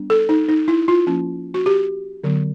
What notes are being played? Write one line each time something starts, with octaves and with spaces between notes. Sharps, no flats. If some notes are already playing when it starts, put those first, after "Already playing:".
Already playing: G3 B3 D4
A4
D#4
D#4
E4
F4
F3 A#3 C#4
F#4
G4
D3 F#3 B3